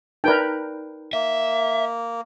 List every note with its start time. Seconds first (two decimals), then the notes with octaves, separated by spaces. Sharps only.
0.24 D#4 A#4 B4 D5 G5
1.13 A#3 E5